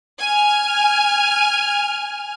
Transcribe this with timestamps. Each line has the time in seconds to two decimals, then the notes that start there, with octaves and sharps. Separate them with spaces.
0.20 G#5 F6